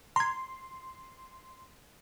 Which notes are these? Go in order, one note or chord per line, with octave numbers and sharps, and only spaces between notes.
A#5 C6 G#6